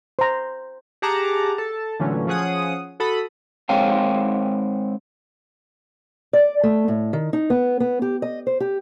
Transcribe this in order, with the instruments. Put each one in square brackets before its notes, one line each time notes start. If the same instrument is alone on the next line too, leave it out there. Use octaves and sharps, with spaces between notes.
[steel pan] C5 A#5
[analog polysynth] G4 G#4 F#5 A5 A#5 D6
A4 A5
A#2 D3 E3 F#3 A3 C#4
F3 C#4 G#4 F#5 D#6
F#4 A4 A5 B5 D#6
[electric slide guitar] G#3 C4 C#5 F5 G5
[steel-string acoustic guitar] D5
A3
A2
D#3
D#4
B3
B3
G4
D#5
C5
G4